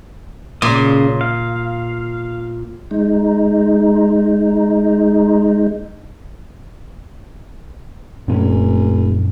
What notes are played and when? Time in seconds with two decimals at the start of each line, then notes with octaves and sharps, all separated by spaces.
0.62 A#2 C#3 C6 D#6
1.21 F5
2.91 G#3 D#4
8.28 F1 F#2 A#2 C#4